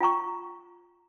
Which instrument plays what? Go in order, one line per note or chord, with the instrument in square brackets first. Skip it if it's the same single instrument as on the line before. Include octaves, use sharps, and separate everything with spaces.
[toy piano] F4 G5 A#5 C#6